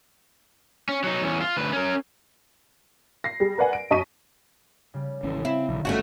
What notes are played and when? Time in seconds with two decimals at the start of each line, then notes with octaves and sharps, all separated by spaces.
0.89 C#4
1.04 F#3 D#4
1.22 E2 C#4
1.41 F4
1.57 D2 B4
1.73 C#4 A#4
3.24 A#6 C7
3.40 G3 G#4
3.58 A#4 B4 D5 F#5 G#5
3.73 D7
3.91 F#2 D#5 A5 C#6 B6 D#7
4.94 C#3 G3
5.23 G#1 E3 C#4
5.45 C4 E4
5.69 B1 D3 D#3
5.85 G1 C#3 A3 C#4 F#4